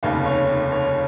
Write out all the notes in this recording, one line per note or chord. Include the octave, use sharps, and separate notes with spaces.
F1 D#2 C#3 F5
C#5
C#5